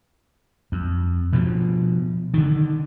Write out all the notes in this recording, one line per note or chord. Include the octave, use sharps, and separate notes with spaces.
F2
B2 F3
D3 D#3